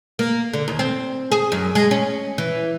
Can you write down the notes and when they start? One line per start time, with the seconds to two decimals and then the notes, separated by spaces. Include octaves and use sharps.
0.19 A#3
0.53 D3
0.68 D#2
0.79 C4
1.32 G#4
1.52 F#2
1.75 G#3
1.91 C#4
2.38 E3